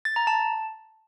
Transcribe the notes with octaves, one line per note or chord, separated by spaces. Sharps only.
A6
A#5
A5